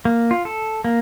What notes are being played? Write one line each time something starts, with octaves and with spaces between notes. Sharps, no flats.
A#3
F4
A4
A#3